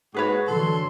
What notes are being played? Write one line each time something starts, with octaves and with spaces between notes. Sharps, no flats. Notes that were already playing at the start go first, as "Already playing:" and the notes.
G#2 F#4 G#4 B4 C#5
D3 E3 F#3 A4 C6